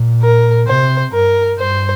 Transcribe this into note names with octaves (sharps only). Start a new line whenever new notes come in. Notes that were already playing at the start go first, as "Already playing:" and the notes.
Already playing: A#2
A#4
C3 C5
G2 A#4
G2 C5